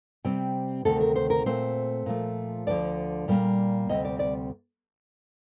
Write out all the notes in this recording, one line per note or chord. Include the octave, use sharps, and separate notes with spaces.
C3 G3 C4 G5
D2 C3 D#3 A3 A4
A#4
C5
A#4
A#2 A3 C4 C5
A#2 F3 A3
D2 D3 F3 D5
A#2 G3 A#3
D2 C3 G3 C4 D#5
D5
D5